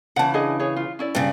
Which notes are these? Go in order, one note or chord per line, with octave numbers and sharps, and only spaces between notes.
C#3 E3 F#5 A5
D4 G#4 D#5
G#4 C#5
F4
C#4 E4 D5
G2 C#3